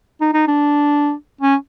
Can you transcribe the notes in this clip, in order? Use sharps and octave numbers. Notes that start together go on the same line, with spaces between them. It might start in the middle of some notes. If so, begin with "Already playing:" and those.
D#4
D#4
D4
C#4